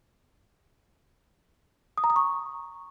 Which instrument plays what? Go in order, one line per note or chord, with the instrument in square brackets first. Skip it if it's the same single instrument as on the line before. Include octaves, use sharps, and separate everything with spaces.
[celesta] D#6
A#5
D#6
C#6